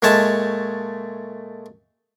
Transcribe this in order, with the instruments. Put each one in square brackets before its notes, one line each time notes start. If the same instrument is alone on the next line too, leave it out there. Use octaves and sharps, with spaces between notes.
[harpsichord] A#2 G#3 A3 C#5 A5